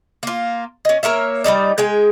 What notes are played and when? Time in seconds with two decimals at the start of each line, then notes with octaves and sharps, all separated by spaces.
0.23 A#3 F4
0.85 C#4 D#5
1.03 A#3 A#4 C#5 E5
1.44 G3 C#4 D#4 D5
1.78 G#3 G5 G#5